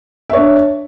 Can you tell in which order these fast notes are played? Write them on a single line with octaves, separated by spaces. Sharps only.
E5 C#5 D4